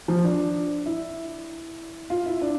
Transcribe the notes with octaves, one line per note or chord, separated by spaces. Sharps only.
F3
D4
E4
F4
E4
D4